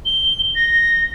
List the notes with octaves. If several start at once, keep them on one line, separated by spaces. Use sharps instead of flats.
G7
A#6